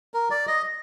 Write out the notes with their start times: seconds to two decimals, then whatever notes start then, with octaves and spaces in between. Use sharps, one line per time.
0.14 A#4
0.31 D5
0.47 D#5